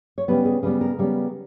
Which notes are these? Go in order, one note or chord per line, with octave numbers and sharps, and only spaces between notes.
C#5
C#3 G3 B3 B4
G#4
C#3 G3 B3 B4
A#4
C#3 G3 B3